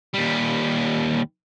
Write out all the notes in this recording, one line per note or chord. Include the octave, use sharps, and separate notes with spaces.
D#2 G3